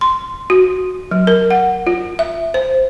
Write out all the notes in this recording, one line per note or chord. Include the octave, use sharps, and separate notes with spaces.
C6
F#4
F#3
A#4
F#5
F4
E5
C5